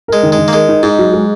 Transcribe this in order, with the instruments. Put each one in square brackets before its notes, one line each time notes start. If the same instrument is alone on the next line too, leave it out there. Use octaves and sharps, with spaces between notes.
[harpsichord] G#3 [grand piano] A#4
[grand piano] D#3
[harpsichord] G#3
[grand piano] D#3
[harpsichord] A#3
[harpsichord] G#3 [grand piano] A#4
[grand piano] D#4
[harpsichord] G#2 [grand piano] D#4
[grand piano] F#3
G#3